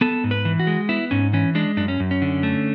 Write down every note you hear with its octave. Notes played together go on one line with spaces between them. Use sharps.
B3 A4
G#2
B4
E3
F#4
G#3
B3 E4
G#2 C#4
E3 C#4
G#3 D4
F#2 D4
C#4
F#2
C#4
D3
A3